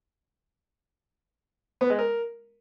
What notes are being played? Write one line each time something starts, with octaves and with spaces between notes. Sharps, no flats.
B3
G#3
A#4